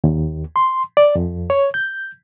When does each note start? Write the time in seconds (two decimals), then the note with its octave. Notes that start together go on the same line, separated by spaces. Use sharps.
0.04 D#2
0.56 C6
0.97 D5
1.15 F2
1.50 C#5
1.74 G6